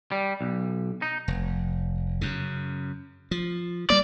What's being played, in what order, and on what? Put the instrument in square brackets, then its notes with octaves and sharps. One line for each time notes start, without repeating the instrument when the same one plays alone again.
[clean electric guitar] G3
B1
D#4
[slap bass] F1
F#2 C#3
F3
[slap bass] G3 A#3 [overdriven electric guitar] D5